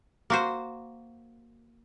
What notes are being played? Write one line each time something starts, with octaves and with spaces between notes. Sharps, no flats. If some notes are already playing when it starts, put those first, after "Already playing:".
A#3 F#4 C5